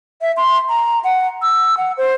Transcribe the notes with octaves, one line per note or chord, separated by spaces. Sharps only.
E5
C6
A#5
F#5
E6
F#5
C5